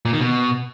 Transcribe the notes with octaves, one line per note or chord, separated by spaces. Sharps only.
A#2
D#3
B2